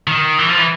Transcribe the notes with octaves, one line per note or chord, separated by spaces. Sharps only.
D#3
E3
F3
E3